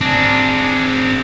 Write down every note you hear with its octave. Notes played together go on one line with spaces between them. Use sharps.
C4 D4 G#4